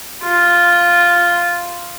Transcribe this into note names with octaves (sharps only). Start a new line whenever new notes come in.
F4